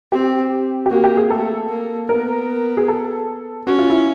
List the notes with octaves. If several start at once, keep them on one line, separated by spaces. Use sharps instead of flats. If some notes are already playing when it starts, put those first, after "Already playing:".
C4 G4
G4
A#3 F#4
G4
G#4
A3 A4
A#3
B3 A#4
G#4
A4
C#4 F#4
F4
E4